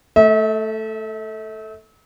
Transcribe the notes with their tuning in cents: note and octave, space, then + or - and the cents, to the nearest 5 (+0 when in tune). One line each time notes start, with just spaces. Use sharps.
A3 +0 E5 -40